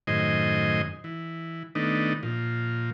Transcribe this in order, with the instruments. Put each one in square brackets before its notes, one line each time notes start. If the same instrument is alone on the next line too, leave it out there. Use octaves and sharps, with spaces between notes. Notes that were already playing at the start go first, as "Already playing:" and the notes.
[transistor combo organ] F#2 A2 D#3 C5 D#5 G#5
E3
D#3 A3 B3 D4 D#4
A#2 F3